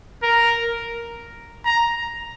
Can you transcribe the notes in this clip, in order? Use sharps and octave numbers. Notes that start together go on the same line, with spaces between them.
A#4
A#5